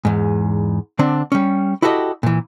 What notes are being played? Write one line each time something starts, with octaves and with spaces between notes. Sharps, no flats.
E2 G#2
D3 C4 D4
G3 C#4
E4 F#4 G4 A4 D5 D#5
A#2 E3